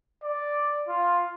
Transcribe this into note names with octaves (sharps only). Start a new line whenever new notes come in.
D5
F4